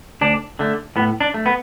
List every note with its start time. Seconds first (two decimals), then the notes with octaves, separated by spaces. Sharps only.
0.21 D2 D4
0.59 D3 A3
0.96 A2 B3
1.20 D4
1.34 A3
1.46 B3